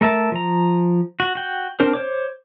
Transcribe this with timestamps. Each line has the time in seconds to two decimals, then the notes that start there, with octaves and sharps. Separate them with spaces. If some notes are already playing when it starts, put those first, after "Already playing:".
0.01 A3 A#4 E5 A5
0.32 F3 A#5
1.20 F#4
1.35 F#4 G5
1.80 C4 D4 A#4 C5
1.93 C5 C#5 D6